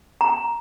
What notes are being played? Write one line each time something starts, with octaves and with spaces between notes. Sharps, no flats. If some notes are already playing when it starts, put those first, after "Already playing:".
A#5